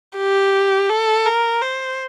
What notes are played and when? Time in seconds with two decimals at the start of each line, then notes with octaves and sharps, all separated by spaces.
0.17 G4
0.90 A4
1.26 A#4
1.62 C5